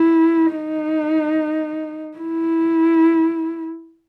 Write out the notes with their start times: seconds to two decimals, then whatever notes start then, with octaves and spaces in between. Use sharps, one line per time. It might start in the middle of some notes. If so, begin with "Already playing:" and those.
Already playing: E4
0.55 D#4
2.18 E4